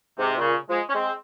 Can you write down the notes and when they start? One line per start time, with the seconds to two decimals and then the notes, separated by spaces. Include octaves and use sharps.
0.19 G#2 C3
0.38 A#2 C#3
0.69 F3 G#3
0.88 C#4
0.94 G#3 C4